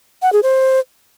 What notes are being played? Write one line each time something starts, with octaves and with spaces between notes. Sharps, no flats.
F#5
G#4
C5